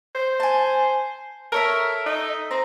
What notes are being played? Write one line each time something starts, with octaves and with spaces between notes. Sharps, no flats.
C5
G#5 A5
A4 A#4 C#5 E5
D#4
C4 A#5